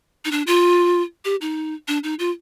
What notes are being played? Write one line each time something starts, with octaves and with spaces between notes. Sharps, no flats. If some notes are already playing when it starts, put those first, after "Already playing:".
D#4
D4
F4
G4
D#4
D4
D#4
F4